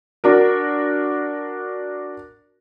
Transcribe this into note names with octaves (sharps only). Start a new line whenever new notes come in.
D4 F#4 A#4